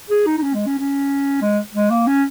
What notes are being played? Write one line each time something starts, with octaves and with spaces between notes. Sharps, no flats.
G#4
D#4
D#4
C#4
G#3
C#4
C#4
G#3
G#3
A#3
C#4